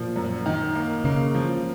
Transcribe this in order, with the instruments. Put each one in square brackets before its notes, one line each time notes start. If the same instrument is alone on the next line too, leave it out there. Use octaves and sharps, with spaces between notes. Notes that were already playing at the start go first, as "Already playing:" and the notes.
Already playing: [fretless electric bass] A#2 [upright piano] F3
[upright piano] F#2
D#3
A#3
[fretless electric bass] C#3 [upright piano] A#3
[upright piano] F3